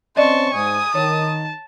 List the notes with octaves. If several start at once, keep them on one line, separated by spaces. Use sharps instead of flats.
C4 C#4 D5 D#5 A5 C6 C#6
G#2 G#5 D#6
D#3 C#5 A5